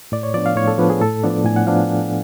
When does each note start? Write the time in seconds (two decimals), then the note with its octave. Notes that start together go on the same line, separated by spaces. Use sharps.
0.12 A2 D5
0.23 C#5
0.34 F3 B3 D4 D5
0.46 F5
0.56 A2 C#5
0.68 A4
0.78 F3 B3 D4 B4
0.90 G#4
1.01 A2 A4
1.24 F3 B3 D4
1.30 D5
1.45 A2 G#5
1.56 F#5
1.67 F3 B3 D4 F5